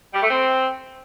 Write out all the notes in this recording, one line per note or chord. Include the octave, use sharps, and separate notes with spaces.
G3
A3
C4